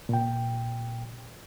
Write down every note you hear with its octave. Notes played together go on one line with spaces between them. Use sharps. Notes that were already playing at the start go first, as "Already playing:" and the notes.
A#2 G5